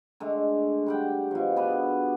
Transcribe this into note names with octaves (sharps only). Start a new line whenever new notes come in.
D3 G#3 A3
G3 F#5 G5
B2 F3
B3 D4 G#4 B4